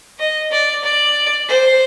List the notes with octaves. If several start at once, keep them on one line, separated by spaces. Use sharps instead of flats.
D#5
D5
D5
C5